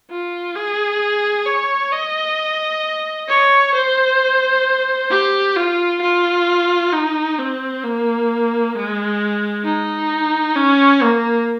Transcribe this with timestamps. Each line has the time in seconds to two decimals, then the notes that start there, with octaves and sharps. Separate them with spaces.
0.10 F4
0.56 G#4
1.46 C#5
1.92 D#5
3.28 C#5
3.75 C5
5.11 G4
5.56 F4
6.01 F4
6.92 D#4
7.39 C4
7.83 A#3
8.75 G#3
9.65 D#4
10.56 C#4
11.02 A#3